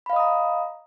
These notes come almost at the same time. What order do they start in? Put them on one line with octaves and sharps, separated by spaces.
B5 F5 D#5 D#6 A#5